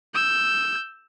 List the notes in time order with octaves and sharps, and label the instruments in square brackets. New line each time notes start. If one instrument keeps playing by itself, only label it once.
[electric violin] E6 G6